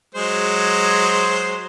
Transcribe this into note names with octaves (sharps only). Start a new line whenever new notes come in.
F#3 G#3 C5